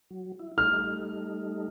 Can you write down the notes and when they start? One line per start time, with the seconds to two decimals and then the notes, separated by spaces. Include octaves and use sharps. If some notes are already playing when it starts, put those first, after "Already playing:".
0.10 F#3
0.39 E4
0.58 G3 A3 D#4 F6